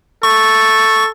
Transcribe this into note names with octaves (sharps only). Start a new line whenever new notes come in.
A4 C#6